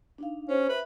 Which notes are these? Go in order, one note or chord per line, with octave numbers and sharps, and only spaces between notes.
D4 D#4 F5
C#4 G4 C5
B4 E5